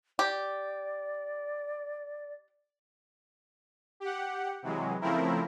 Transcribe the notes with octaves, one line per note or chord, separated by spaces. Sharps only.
G4 D5
G4 F#5
C3 E3 F#3 G#3
C#3 F3 A3 C4 E4 A#4